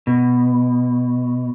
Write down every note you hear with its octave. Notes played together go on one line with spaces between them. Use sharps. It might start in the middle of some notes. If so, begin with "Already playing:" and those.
B2